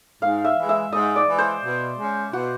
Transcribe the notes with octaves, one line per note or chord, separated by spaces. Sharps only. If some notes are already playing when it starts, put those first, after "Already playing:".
G#2 F5
E5
E3 G#3
E5
G#2 D#5
D5
E3 G#3
C5
B2
G#3
C#4
B2 F#4